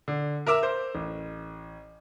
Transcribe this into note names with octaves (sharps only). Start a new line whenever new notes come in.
D3
A#4 E5 D6 E6 E7
C5
A1